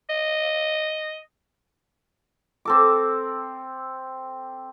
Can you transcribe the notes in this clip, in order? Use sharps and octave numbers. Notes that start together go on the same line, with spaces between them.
D#5
C4 A4 D6